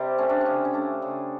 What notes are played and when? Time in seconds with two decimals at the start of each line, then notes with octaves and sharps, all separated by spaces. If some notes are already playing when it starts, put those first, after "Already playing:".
Already playing: C3 G3
0.18 A3 C#4
0.29 D4
0.41 C#4
0.46 C#3
0.65 C#4
0.74 A3 D4
1.02 C#3